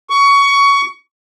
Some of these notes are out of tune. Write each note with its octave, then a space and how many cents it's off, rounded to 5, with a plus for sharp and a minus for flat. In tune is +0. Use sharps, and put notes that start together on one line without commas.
C#6 +20